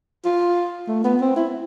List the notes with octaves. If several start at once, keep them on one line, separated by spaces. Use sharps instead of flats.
F4
A3
B3
C4
E4